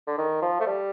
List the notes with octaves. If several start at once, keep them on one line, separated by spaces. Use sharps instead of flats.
D3
D#3
F3
A3
G3